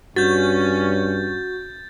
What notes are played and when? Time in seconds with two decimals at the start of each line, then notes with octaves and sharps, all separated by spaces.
0.16 G2 C#4 F#4 G6 A6